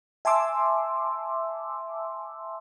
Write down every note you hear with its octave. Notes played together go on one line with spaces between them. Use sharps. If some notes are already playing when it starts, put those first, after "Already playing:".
E5 G#5 A5 C6 D6 E6